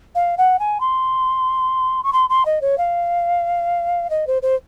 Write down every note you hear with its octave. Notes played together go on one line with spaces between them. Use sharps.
F5
F#5
G#5
C6
C#6
C6
C6
D#5
C#5
F5
D#5
C5
C5